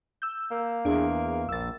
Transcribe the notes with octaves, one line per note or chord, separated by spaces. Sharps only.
E6 G6
A#3
E2 D4 G#4
A#1 E6 A6